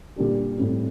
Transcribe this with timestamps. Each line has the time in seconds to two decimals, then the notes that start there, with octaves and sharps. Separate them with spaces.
0.16 A#2 G3 D4 G4
0.58 A2 G3 C4 G4